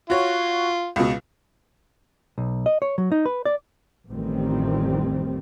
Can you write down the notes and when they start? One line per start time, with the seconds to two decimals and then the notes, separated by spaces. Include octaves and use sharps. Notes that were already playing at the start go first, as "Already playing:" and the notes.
0.10 F4 F#4 C#5
0.96 C#2 B2
2.38 B1
2.66 D#5
2.82 C#5
2.98 F#3
3.12 D#4
3.26 B4
3.45 D5
4.09 A1 F2 A2 D#3 G3 C4